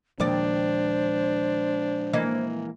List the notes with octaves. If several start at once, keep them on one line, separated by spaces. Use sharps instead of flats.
D#2 A#2 F3 G#3 D4 C5 D5
E3 A#3 D#5